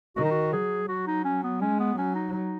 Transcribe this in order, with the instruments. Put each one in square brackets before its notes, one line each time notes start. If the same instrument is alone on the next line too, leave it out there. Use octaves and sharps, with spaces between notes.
[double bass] D#3 [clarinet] F#4
[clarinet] D#4
F#4
[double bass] F#3 [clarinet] G#4
[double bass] F#3 [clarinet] F#4
[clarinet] D#4
C#4
B3
[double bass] G#3 [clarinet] C#4
[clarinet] B3
[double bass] F#3 [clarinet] C#4
[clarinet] D#4
D#4